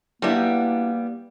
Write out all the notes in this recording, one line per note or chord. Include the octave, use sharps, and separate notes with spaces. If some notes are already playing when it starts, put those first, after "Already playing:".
F#3 G3 A#3 B3 D4 E4